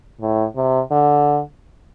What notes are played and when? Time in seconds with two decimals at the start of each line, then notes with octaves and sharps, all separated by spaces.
0.21 A2
0.56 C3
0.91 D3